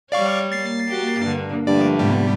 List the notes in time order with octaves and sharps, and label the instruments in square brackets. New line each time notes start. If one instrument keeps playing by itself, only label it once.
[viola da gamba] G3 C#5 [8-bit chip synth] D5 F5 C#6
[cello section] A#3 [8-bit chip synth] A6 C7
[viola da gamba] F#4 G4
G2 D3
[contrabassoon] G2 [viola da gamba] D3 F3 A3 [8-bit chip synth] D5
[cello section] G#2 C3 B3 [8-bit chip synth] G3